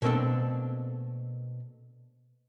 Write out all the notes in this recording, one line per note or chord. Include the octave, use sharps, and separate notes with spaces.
B2 A3 A#3 C4 D4 A4